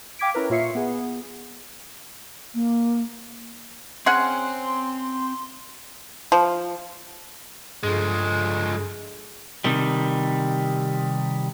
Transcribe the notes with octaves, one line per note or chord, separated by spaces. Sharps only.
F5 G5 D6 G#6 B6 D7
C#4 E4 A#4 B4
A#2 F4 C#5 E5 C7 C#7
B3 G#4
A#3
C4 C#4 G#4 C5 F#5 C6
F3
G2 F3 G#3 G#4 A4
C3 D#3 G3